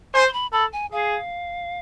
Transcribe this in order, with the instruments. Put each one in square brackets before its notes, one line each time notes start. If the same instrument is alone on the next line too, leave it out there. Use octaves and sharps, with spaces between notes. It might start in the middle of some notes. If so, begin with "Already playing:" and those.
[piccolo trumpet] C5 [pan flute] G#5
[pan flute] C6
B5
[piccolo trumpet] A4 [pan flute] B5
[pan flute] G#5
[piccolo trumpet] G#4 [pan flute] F5